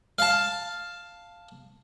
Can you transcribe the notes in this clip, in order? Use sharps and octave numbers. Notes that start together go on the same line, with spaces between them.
F5 A5